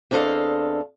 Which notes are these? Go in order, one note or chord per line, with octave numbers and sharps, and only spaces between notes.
E2 C4 D4 A4 D#5 F5